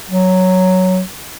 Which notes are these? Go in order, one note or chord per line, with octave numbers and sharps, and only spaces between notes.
F#3